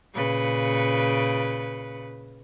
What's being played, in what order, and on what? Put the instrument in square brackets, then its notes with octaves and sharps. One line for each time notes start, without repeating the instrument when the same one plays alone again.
[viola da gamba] A#2 C#3 B4